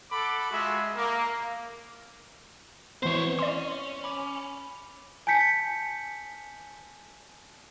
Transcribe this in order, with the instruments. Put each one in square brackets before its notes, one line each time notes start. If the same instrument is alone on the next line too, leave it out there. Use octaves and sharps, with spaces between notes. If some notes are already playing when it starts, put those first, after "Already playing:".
[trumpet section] A4 F#5 B5 D6
G#3 F4 F#4 G#4 E5
A#3
[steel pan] E3 B3 C4 [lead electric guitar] C5 C#5
[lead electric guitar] C#4 [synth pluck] D5 C6
[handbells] B5 D6
[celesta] G#5 A5 G6 B6 C#7